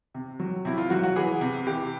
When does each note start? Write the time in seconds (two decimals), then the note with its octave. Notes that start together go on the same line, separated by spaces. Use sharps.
0.14 C3
0.40 F#3
0.65 C3 E4
0.78 F4
0.90 F#3 F#4
1.03 F#4
1.16 E3 G#4
1.41 C3
1.67 E3 G4